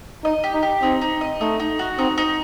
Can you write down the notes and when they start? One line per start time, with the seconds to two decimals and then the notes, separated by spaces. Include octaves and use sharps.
0.24 D#4 D#5
0.44 G4
0.54 D#4
0.63 G4
0.82 C4 D#4
1.01 D#4
1.21 D#5
1.41 A3 D#4
1.60 D#4
1.79 F#4
1.98 C4 D#4
2.18 D#4